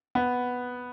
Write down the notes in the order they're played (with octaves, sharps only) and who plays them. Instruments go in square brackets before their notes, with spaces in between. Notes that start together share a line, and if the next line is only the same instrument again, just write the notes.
[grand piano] B3